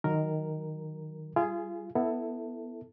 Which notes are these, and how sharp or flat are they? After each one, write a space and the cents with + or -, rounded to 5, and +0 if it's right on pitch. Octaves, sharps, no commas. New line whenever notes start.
D#3 +0 F#3 +0 A#4 +0
G3 -5 F4 -30 G#4 +0
B3 +0 E4 +0 A4 +15